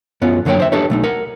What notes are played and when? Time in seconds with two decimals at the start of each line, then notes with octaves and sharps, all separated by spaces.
0.21 F#2 B3 C#4 F4
0.45 F#2 D3 F#3 A#3 C#5 G5
0.60 C5 E5
0.72 D4 F#4 G4 A4 B4 C#5
0.90 B1 A3 D#4
1.04 A#4 F#5